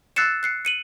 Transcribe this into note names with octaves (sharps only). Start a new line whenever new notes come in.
E6 F#6 A6 C7 C#7 E7
F#6 C7 C#7
C#7 D#7 F#7